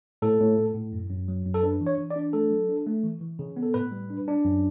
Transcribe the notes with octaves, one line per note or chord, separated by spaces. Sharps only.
A2 A4
A2
A2
A2
F#2
F#2
F#3
F#2
A4
D4 B4
E3
C#5
E3
D5
D4
A3 A4
F#3
D4
A3
E3
E3
C#3
B3
A4
A2 B4
G3
D4
D4
F#2